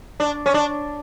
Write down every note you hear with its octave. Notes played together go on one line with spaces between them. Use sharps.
D4
C#4
D4